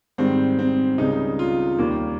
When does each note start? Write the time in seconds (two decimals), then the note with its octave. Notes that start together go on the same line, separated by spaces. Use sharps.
0.18 G#2 D#3 G3 C4
0.59 C4
0.98 C#2 C#3 G3 D#4
1.39 F4
1.78 D#2 D#3 G3 A#3